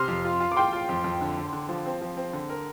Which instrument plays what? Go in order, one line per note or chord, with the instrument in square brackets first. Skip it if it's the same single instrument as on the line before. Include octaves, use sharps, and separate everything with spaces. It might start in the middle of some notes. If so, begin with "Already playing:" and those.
Already playing: [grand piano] C3 [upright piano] C6 F6
[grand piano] F2
F4
F4
[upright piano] D6
[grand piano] F4 [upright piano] G5 C6
[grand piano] F4
F2
F2
D3
D3
D3
F3
C4
F3
C4
D3
A#4